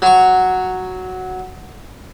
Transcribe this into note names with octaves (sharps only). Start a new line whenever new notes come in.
F#3 C#6